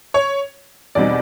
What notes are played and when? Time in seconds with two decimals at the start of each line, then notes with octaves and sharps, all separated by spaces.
0.14 C#5
0.95 E2 B2 G3 C4 D#4 D5